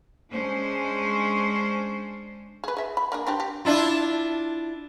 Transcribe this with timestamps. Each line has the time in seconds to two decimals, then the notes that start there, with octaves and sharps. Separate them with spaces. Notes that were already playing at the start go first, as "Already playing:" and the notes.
0.31 G#3 C#4 D4 C5
2.64 G#4 B4
2.77 G#4 E5
2.97 B5
3.12 A#3 D4 G#4
3.27 C4 D4 G4
3.40 G4
3.65 D4 E4 F4